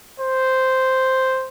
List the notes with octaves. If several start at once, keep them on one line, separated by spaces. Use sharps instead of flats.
C5